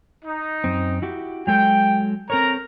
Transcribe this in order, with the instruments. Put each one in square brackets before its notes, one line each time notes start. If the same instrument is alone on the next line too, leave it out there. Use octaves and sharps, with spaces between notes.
[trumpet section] D#4
[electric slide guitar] F#2 C4
E4 F#4 G4
[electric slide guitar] F#3 G#3 A4 [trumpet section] G5
[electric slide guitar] C4 A4 C#5 [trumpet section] A#4 A#5